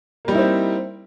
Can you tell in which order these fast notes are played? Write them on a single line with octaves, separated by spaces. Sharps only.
A#3 G3 D#4 E4 C4